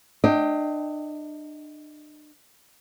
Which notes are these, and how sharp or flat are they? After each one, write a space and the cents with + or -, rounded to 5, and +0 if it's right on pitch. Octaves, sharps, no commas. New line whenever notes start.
D4 +35 D#5 +25 G5 +0